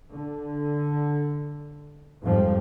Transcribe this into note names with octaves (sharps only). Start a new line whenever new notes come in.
D3
F2 G#2 F3 G3